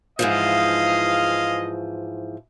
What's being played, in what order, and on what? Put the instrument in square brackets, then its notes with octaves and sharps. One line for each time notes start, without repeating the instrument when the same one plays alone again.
[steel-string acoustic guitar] G#2 E3 F3 [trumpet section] G#3 D#5 F5